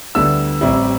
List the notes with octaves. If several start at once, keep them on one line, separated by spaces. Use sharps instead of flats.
D2 D3 G3 B3 E4 E6
A1 A2 G3 C4 E4